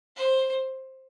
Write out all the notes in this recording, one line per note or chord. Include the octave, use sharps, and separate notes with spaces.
C5